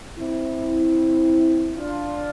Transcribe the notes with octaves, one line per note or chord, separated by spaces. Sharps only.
C4 E4
D4 F4